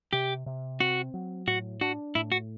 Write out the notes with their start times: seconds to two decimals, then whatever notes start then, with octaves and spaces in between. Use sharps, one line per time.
0.13 C3 G4
0.46 C3
0.80 C4 F#4
1.14 F#3
1.47 A2 F#4
1.81 D4 F#4
2.15 A2 E4
2.32 F#4